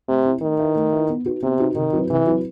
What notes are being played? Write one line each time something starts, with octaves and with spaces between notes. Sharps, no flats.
C3 A3
C4 E4
D#3 A3
E4 B4 E5
A3
E4 B4 E5
B3
D#4 F#4 B4
C3 B3
D#4 F#4 B4
C3 D#3
F#3 C4 E4 B4
C3 E3
F#3 C4 E4 B4